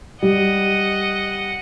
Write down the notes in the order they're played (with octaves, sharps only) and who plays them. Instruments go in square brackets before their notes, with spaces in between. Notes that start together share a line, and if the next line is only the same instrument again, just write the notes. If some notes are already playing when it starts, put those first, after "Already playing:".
[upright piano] G3 [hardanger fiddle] D#5 F#5